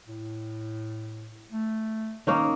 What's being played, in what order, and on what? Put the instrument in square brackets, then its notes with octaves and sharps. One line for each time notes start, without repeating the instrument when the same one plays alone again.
[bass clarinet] A2
A3
[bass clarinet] D#3 [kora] A#3 C#4 D#4